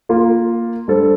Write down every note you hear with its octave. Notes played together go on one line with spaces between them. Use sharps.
A#3 F4 A#4
G3 D4 A4 C5